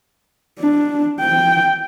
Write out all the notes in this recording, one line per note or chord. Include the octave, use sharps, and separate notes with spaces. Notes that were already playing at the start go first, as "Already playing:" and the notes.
D4
G5